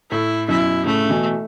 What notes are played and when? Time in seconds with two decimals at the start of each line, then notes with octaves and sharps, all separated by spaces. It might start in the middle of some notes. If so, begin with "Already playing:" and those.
0.11 A2 E4
0.48 F#2 B2 E4
0.85 A2 C#3 A3
1.04 C#3
1.10 B2 E3